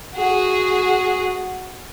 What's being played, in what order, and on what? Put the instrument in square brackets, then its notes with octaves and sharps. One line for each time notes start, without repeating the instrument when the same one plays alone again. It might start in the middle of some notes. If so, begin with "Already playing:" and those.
[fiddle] F#4 G#4